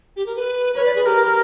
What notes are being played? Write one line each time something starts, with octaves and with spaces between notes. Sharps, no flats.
G4
A#4
B4
B4 C#5
D5
G#4
G4 A#4